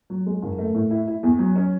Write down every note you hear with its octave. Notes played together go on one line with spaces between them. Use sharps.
F#3
G#3
F#1
A3
A2
E4
E4
E2
F#3
C#4